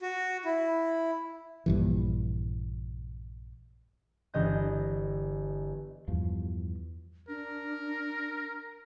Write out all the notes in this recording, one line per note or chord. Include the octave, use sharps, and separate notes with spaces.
F#4
E4
A#1 G2 E3
G1 E3 D#5 G6
E2 G2 F3
D4 A#4